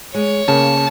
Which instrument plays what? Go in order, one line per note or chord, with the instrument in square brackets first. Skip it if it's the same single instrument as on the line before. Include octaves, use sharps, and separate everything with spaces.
[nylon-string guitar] G#3 [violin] C#5
[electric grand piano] C#3 [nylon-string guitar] A#3 [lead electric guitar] A5